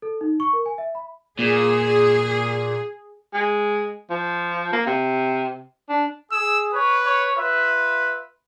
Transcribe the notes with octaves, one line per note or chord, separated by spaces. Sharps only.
A4
D#4
C#6
A#4
G#5
E5
B5
A#2 G#4
G#3
F3
A#3
C3
D4
G#4 E6
B4 C#5
C#5
F4 B4 E5